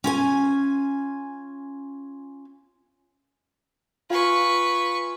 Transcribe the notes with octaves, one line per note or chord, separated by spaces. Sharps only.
C#4 F4 G#5
F4 B4 G#5 C#6